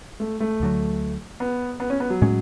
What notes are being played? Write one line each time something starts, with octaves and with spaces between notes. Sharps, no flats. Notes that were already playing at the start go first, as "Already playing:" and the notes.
A3
A3
D2 D3 F#3
B3
B3
C#4
B3
F#3
A2 G#3 C#4